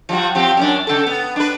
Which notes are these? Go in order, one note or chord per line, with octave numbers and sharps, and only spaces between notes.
F3 G3 F#4
F3 C4 G4
F#2 C#4 D4
C#3 A4
B3
D4 B4